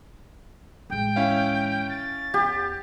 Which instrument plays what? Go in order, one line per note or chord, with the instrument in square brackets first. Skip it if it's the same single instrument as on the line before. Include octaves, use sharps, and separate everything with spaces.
[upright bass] A1 G#3 [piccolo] G5
[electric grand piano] C#4 E4 F5
[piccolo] A6
[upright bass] E2 [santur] G4